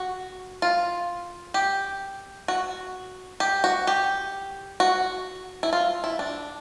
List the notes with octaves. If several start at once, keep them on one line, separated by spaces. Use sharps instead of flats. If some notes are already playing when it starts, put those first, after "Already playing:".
Already playing: F#4
F4
G4
F#4
G4
F#4
G4
F#4
E4
F4
E4
D4